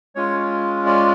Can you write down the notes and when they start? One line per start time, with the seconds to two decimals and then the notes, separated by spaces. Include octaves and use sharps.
0.15 G#3 C#4 F4 C#5
0.86 D5